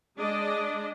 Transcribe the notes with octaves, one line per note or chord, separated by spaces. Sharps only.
G#3 D4 D5 D#5